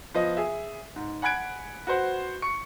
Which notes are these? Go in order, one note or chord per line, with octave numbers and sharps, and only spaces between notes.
F3 B3 D#5
G#4 E5
G#2
F#5 G#5 B5 F#6 G#6 D7
F#4 B4 C5 F#5
C#6 C#7